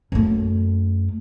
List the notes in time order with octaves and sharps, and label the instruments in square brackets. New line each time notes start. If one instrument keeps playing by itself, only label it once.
[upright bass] F#2 A3